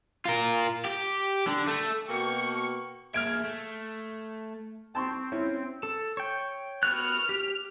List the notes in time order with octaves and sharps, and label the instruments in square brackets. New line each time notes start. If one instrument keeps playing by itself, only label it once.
[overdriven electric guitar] F4 A#4
G4
D3
A3
[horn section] B2 A#3 [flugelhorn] G5 [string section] C#6
[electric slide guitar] A#3 G#4 E5 [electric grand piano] F6 G#6 D7
[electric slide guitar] A3
[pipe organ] C4 [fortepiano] A5 C6 C#6
[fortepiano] C#4 E4
[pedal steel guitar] A4
C#5 G5
[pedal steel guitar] B3 F#4 F#6 [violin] F6
[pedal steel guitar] G4